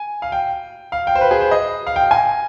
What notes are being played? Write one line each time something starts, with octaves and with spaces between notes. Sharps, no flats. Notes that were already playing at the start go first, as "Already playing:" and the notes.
Already playing: G#5
F5
G5
F5
G5
C5
B4
G#4
C5
D#5
F5
G5
G#5